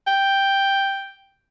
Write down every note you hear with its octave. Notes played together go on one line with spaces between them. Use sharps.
G5